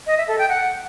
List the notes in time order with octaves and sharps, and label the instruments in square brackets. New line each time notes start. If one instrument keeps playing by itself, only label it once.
[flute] D#5
E5
A4
G5
F#5